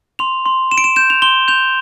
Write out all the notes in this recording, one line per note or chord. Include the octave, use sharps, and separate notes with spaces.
C6 F7
C6
C6 E7
D7
E7
G6 E7
F7
C6 G7
G6 F7